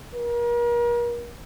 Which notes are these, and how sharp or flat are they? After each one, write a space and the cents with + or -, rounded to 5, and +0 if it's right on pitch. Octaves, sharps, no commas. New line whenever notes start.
A#4 +40